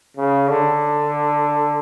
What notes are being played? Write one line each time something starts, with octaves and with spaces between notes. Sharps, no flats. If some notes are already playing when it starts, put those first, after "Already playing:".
C#3
D3